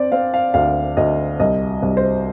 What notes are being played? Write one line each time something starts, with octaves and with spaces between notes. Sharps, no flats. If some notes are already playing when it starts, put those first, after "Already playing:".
Already playing: C4 D5
C4 F5
F5
D2 F5
D2 D#5
C2 D#5
C2
C5